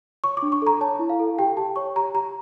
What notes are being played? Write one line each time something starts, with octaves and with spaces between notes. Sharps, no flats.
C#5 C#6
D6
D4
C#6
A4 A#5
C#5 A5
E4
F5
A4
G4 G5
G4 A5
C#5 C#6
G4 A#5
G4 A#5